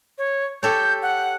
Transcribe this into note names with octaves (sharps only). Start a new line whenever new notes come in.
C#5
G4 A4 C#5 G6
F#5